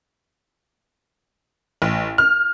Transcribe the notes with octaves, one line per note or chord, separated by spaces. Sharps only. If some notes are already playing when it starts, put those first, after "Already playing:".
A1
F6